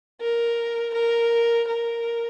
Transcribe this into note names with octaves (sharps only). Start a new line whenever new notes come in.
A#4
A#4
A#4